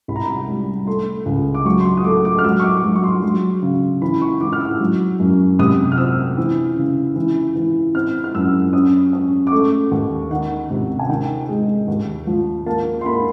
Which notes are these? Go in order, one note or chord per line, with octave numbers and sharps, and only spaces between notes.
C2 B5
A#5
B5
G3
A3 C6
C#2
D6
F#3 C#6
C6
C#6
D#6
A3 D6
D6
F6
F#3 E6
C#6
D6
F#3
C#6
C6
F#3 C6
C#3
E3 B5
C#6
E3 D6
F6
E6
F#3
F#2
C3 D#6
F6
C4 E6
E3
C#3
E3
E3
C4 F6
F6
F#2 E6
C#4 D#6
C#4
D6
A3 C#6
D#2
D#3 F#5
C3
G#5
D#3 G5
G#3
D#2
F3
A#3 A5
C6
A#3 B5